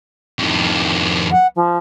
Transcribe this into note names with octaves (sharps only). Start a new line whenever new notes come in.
F2 D#3
F#5
F3